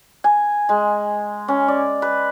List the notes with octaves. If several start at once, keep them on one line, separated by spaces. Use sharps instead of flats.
G#5
G#3
C#4
D5
B4